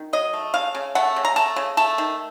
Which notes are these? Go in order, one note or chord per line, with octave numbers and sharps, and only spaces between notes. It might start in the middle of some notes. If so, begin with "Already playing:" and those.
Already playing: D#3
F#3 D#5
A3
C#3 F5
C#3
A3 F#5
C#3
A#5
A3 A5
C#3
A3 A5
D#3